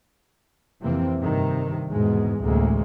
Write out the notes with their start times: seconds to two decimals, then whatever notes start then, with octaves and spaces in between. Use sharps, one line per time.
0.81 F2 C3 E3 A#3 C4
1.18 G2 C3 D#3
1.90 E2 G#2 B2 G#3
2.41 A1 D2 C3 G#3 A#3